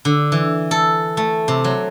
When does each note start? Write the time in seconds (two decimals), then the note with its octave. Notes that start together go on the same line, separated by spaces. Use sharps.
0.05 D3
0.32 E3
0.71 A4
1.17 A3
1.48 C3
1.64 F#3